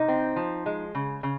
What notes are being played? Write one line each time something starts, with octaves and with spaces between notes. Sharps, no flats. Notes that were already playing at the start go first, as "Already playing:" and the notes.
Already playing: C3 D#4
C4
F3
G#3
C#3
C#3